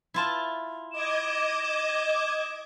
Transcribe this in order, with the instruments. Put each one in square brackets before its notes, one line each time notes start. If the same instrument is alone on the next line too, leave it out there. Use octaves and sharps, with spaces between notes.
[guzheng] E4 F4 A5
[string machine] D#5 D6 G#6 [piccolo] E7